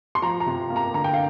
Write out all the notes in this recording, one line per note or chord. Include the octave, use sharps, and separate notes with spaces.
C6
F3 A#5
A#5
C3
A#3
A#5
D3 A#5
G5
F5